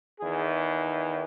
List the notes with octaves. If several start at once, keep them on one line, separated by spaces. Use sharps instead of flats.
E2 D#3 G#4